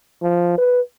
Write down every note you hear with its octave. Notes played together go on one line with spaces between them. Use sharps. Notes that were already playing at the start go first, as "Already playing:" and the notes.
F3
B4